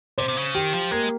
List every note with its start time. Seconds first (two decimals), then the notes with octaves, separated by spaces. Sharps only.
0.18 C3 C5
0.28 C3
0.37 C#3
0.54 D#3 G4
0.73 F3
0.91 G#3 A#3